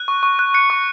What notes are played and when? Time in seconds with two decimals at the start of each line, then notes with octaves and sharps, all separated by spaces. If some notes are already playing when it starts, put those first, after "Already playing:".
Already playing: F#6
0.08 C#6
0.23 C#6
0.39 F#6
0.54 F#6 C#7
0.70 C#6